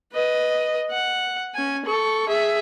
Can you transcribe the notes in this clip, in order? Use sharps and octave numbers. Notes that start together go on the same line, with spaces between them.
B4 D#5
F#5
C#4 G#5
A4 C#6
G#4 E5